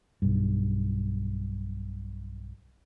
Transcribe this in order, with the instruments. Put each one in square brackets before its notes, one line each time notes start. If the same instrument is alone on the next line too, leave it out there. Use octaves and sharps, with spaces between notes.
[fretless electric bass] B1 G2